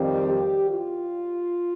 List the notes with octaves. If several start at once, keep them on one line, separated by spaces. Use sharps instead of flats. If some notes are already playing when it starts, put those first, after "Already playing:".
Already playing: F2 D#3 G3 C4
G4
F4